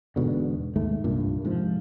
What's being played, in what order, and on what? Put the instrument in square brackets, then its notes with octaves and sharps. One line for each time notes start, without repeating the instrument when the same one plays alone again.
[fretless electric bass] E1 G#2 B2 D3
D#2 G#2 A3
C2 G2 A#2
G#2 C3 F3